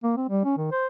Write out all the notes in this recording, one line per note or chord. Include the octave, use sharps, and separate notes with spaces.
A#3
C4
G3
C#4
D#3
C5